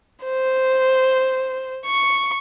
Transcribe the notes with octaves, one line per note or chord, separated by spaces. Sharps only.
C5
C#6